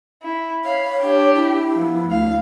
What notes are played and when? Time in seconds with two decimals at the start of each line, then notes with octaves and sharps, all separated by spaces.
0.22 E4
0.65 C#5 F5 B5
1.00 D4 G4
1.34 E4
1.74 F3 B3
2.08 D2 F5